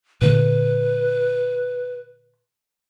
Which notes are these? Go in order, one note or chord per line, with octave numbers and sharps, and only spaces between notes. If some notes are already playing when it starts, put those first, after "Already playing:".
A#2 D3 A3 B4